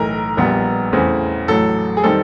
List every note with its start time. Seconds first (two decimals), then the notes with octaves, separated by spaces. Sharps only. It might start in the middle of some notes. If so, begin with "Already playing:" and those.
Already playing: B1 A2 E3 A#4
0.37 A#1 A#2 G3 B3
0.93 E2 C#3 E3 A3 C4
1.48 A1 A2 F#3 A4
1.97 G#4
2.04 D#3 G3 C4 A4